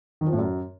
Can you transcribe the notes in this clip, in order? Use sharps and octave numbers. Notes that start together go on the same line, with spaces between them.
D#3
F3
A2
F#2